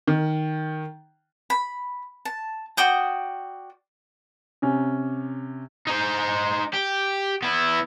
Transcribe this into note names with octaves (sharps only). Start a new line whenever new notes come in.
D#3
B5
A5
F#4 D5 G5 D#6
C3 C#4
D#4 C5
G4
B3 E4